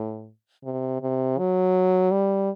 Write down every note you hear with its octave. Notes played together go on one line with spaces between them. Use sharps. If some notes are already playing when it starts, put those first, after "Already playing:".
Already playing: A2
C3
C3
F#3
G3